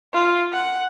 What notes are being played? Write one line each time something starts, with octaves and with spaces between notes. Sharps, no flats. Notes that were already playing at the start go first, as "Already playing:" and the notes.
F4
F#5